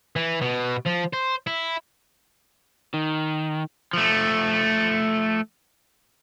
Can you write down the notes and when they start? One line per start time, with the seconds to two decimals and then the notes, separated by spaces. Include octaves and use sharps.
0.16 E3
0.41 B2
0.86 F3
1.14 C5
1.47 E4
2.94 D#3
3.93 F3 A3